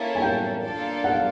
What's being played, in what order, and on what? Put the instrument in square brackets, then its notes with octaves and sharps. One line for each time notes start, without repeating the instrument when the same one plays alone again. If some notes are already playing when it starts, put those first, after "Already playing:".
Already playing: [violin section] A#3 C#4 E4 A4 C#5
[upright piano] G#5
G5
[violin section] A#3 D4 F4 A4 D5
[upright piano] F#5
F5